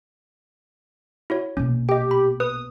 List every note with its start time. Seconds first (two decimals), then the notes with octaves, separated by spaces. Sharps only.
1.30 E4 F#4 C#5
1.57 A#1 B2 C#4
1.89 G4 D#5 G5
2.11 B5
2.40 B4 D#6